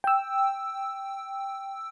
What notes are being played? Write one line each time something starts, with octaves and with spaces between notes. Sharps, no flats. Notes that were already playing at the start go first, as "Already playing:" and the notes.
G5 E6